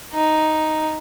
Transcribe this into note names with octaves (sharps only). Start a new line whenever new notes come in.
D#4